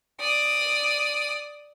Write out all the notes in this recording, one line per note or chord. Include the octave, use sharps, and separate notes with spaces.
D5 D#6